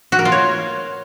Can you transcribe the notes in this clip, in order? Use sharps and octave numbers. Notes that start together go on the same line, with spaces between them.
F#4
A#4
F4
C#5